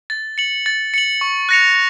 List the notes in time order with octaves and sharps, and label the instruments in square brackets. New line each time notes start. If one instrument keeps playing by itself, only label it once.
[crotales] A6
C#7 F#7
A6
C#7 F#7
C#6
F#6 A#6 C#7 F7